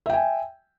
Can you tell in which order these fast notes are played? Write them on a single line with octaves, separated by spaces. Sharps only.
E5 G5 G#5